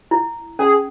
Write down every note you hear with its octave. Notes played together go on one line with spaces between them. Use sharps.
E4
C#4 G#4